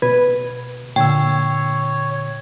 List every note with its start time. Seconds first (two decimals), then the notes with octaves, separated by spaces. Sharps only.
0.02 B2 B4 G#6
0.96 A#2 D3 C#5 G5 E6